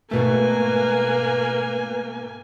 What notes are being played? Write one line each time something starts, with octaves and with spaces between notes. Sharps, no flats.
G#2 B2 A3 A#3 B4 G#5